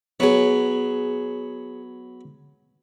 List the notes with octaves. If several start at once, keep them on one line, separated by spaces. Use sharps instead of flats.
F#3 B3 G#4 C#5